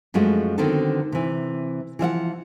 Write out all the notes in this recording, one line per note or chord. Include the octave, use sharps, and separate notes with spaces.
F#2 F3 G#3 A3 F#4
D3 D#3 B3 C4 F#4 A4
C3 E3
E3 F3 E5 F#5